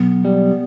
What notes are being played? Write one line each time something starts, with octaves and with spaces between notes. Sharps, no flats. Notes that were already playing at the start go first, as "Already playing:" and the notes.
Already playing: B1 B3
G3